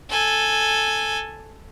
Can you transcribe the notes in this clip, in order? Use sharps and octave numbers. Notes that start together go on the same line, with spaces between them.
A4 G#5